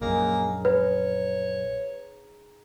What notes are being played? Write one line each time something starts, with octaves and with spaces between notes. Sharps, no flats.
A#1 F#2 G#3 A#3 D#4 G#4
B4 C#5